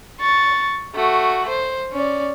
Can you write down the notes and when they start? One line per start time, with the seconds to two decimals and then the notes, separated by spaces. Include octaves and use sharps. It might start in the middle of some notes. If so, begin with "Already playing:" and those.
0.20 C#6 A6
0.95 A3 F#4
1.49 C5
1.92 C#4 D5